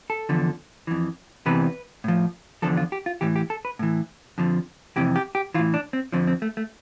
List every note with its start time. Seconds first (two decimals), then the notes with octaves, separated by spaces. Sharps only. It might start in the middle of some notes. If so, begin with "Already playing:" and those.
0.10 A4
0.29 E2 D3 F3
0.87 F2 E3
1.46 E2 C3 E3 B4
2.04 A2 F3
2.62 E2 D3 F3 A4
2.77 F4
2.92 G4
3.06 F4
3.21 A2 E3 G4
3.36 G4
3.50 A4
3.65 B4
3.79 A2 E3
4.38 F2 D3 F3
4.96 F2 C3 E3 G4
5.16 G4
5.35 G4
5.54 E3 F4
5.58 A2
5.74 D4
5.93 C4
6.12 F2 D3 F3 C4
6.27 C4
6.42 A3
6.57 A3